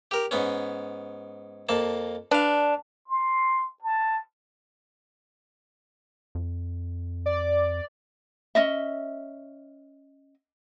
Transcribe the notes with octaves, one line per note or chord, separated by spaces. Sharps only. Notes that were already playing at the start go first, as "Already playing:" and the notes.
G4 A#4
G#2 B3 C#4
F2 A#3 A5
D4 B4 F5
C6
A5
F2
D5
C#4 D#5 E5